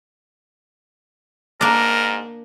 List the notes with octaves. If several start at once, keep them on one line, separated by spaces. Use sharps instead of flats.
G#2 A#3 D4 A#4